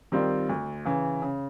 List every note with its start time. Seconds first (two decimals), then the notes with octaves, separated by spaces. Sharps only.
0.12 D#3 G3 C4 F4
0.49 D2
0.85 C#3 E3
1.22 C#3